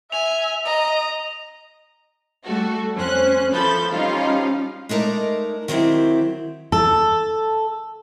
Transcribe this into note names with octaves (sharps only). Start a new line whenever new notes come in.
E5 G#5 F7
D#5 A#5
G3 A3 F#4 A4
F2 C#4 C5 F#6
E3 F3 A4 B5 G6 A6
F3 G3 C#4 D#4 F4 F5
G#3 A3 D#4 A#4 D5
D#3 F#3 C4 E4 G4
A4